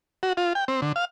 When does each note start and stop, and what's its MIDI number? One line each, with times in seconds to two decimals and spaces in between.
0.23 0.33 66
0.37 0.53 65
0.55 0.65 79
0.68 0.81 60
0.82 0.92 50
0.96 1.05 77